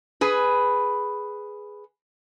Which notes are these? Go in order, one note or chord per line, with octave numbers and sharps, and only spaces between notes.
G#4 B4